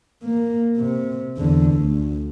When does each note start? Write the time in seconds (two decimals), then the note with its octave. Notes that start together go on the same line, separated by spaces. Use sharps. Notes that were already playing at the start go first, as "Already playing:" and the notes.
0.24 A#3
0.78 C3
1.37 E2 D3
1.74 D2